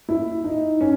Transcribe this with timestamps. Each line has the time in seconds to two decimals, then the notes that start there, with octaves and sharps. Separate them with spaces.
0.09 E4
0.44 D#4
0.81 C#4